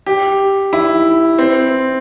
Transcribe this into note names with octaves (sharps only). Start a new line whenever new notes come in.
G4
E4
C4